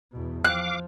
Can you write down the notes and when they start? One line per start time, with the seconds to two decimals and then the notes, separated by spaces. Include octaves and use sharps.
0.12 E2 B2
0.44 F3 F5 D6 F#6